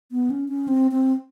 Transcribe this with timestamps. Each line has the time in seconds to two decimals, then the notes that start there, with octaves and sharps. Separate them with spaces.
0.12 B3
0.30 C#4
0.49 C#4
0.68 C4
0.91 C4